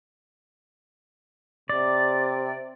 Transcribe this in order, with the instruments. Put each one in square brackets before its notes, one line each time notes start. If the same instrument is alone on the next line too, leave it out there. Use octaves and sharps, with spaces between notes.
[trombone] C3 [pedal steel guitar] D5